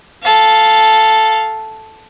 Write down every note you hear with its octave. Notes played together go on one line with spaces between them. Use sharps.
A4 F5